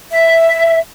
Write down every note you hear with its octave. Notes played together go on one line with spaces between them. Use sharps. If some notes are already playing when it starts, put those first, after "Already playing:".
E5